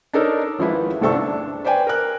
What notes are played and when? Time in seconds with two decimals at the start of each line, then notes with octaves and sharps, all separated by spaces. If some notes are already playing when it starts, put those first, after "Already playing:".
0.13 D4 D#4 A4 A#4 C#5
0.59 G#1 F3 G#3 E4 B4
1.01 G1 C2 G2 A4 C5 C#6
1.14 D4
1.64 B4 C5 D5 G5 G#5
1.87 A#4 F#6